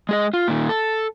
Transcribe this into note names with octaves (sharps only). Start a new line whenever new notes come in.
G#3 G#4 D#5
F4
A#2 D#3
A4